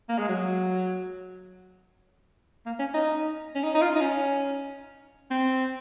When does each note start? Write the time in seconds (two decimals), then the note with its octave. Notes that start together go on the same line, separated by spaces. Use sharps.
0.09 A#3
0.19 G#3
0.29 F#3
2.66 A#3
2.80 C#4
2.94 D#4
3.55 C#4
3.64 D#4
3.75 D#4
3.82 F4
3.96 D#4
4.01 C#4
5.31 C4